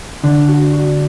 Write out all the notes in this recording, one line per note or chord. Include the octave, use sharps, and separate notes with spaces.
D3 D4
F#4
F#4